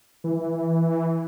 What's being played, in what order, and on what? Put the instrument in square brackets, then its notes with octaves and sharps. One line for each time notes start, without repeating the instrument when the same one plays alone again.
[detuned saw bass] E3